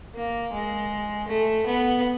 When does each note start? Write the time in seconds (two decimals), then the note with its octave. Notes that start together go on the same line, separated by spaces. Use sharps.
0.15 A#3
0.52 G#3
1.28 A3
1.66 B3